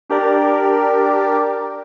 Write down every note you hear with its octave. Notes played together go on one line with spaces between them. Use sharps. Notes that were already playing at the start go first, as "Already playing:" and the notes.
D4 G4 A#4 D5